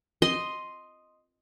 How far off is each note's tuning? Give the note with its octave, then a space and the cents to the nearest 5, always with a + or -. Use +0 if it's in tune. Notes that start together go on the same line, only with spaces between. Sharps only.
D#5 +0 C6 +0